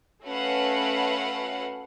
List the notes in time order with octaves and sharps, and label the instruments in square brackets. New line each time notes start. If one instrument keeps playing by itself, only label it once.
[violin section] A3 C#4 F#4 B4 F5 F#5